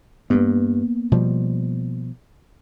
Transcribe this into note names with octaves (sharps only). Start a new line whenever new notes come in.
G2 A#3 B3
B2 F3 G3